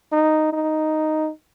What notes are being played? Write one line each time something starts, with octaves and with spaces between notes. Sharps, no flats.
D#4
D#4